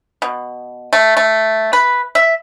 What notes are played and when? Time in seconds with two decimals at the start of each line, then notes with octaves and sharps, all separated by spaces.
0.22 B2
0.93 A3
1.17 A3
1.73 B4
2.15 E5